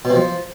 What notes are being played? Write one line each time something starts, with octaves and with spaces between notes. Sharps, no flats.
B2
C3
F3